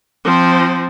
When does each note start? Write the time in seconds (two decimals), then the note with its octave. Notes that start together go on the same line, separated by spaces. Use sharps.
0.25 F3 C4